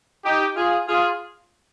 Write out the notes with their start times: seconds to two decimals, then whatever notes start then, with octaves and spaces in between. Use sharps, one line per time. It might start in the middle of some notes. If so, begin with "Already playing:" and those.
0.24 D#4 G4
0.56 F4 G#4
0.88 F4 G#4